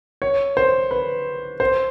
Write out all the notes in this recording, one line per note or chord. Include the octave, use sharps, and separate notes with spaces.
C#5
C5
B4
C5